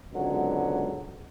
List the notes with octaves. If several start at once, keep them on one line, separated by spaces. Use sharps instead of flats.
C#2 G#2 B2 D3 F#3